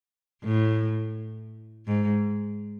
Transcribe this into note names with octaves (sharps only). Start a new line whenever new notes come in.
A2
G#2